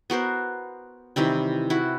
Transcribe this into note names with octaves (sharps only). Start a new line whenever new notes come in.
B3 F#4 A#4 C5
C3 D#3 E3 G3
E4 F#4